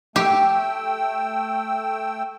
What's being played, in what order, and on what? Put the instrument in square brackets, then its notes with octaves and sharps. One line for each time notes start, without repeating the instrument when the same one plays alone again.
[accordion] A3 G5 E6 [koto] G4